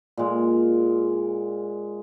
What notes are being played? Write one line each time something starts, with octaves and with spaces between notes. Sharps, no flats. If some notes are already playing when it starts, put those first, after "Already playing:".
A#2 G#3